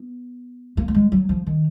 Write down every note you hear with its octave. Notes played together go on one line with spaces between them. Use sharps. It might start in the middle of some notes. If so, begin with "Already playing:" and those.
Already playing: B3
A#3
A#3
G#3
F#3
F3
D#3